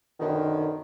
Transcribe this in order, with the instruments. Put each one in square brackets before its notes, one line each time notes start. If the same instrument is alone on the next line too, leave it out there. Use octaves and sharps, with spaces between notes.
[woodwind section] F#2 B2 D3 D#3